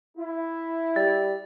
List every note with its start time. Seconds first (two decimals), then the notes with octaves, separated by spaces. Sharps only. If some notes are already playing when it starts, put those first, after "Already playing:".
0.17 E4
0.96 G3 A6